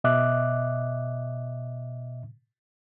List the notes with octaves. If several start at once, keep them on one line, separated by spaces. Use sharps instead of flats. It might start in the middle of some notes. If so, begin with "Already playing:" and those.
B2 D#5 E5 D6 F#6